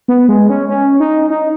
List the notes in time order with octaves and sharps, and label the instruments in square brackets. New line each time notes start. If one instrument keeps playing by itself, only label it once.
[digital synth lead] B3
G#3
C#4
C#4
D#4
D#4